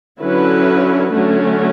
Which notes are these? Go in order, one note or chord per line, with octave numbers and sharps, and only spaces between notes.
D3 F#3 C#4 E4 B4
D3 F#3 A3 C#4